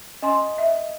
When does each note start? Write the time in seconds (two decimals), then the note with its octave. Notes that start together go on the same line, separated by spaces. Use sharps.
0.22 C#4 D#5 G#5 C6
0.58 E5